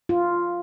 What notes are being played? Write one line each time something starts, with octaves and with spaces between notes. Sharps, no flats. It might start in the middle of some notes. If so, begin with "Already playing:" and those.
F4